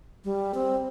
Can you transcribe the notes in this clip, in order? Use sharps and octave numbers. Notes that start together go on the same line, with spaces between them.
G3
C4